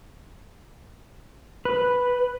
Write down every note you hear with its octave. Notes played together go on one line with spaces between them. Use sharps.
B4